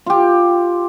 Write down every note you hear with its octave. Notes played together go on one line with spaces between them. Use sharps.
F4 G4